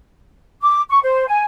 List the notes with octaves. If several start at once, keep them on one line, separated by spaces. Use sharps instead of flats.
D6
C#6
C5
G#5